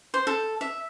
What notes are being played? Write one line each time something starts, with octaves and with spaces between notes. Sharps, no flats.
C5
A4
E5